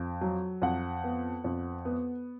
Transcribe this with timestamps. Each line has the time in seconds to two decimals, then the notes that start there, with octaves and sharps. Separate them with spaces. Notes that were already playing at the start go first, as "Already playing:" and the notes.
Already playing: F2
0.21 F#3
0.62 F2 F#5
1.04 B3
1.44 F2
1.85 B3